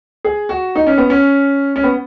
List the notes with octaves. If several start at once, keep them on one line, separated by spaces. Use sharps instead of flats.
G#4
F#4
D#4
C#4
B3
C#4
C#4
B3